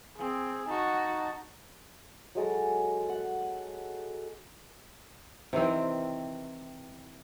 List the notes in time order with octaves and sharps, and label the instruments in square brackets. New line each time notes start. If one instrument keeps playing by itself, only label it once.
[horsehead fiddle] C4 [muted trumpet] G#4
[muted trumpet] D#4 [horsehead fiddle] F#4 A5
[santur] F#3 G#3 A4 A#5
F#5
[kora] C3 D#3 E3 C4